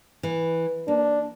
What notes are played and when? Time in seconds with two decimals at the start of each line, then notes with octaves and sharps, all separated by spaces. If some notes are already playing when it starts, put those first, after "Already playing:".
0.23 E3
0.88 A#3 D4